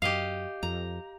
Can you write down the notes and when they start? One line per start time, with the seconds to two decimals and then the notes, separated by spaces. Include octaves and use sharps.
0.02 F#2 G4 D#5 F5
0.63 F2 A#5